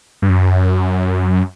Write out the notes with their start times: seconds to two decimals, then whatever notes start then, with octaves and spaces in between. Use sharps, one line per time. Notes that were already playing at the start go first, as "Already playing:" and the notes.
0.22 G2
0.29 F#2